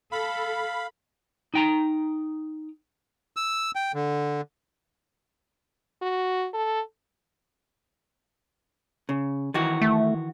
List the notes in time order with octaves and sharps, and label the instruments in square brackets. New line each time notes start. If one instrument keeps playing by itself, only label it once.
[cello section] A4 [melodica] F5 [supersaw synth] B5
[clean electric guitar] D#4 G5 A#5
[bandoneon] E6
G5
D3
[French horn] F#4
A4
[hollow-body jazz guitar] C#3
D#3 E3 F#4
[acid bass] A3